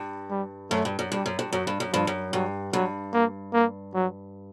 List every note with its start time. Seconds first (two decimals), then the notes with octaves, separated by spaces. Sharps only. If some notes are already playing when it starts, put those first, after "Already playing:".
Already playing: G2
0.30 G3
0.71 F#2 A3
0.85 G2
0.99 F#2
1.11 G2 G3
1.26 F#2
1.39 G2
1.51 F#2 F#3
1.67 G2
1.80 F#2
1.92 G2 F3
2.07 F#2
2.32 G2 F#3
2.73 G2 F#3
3.13 A#3
3.53 A#3
3.94 F#3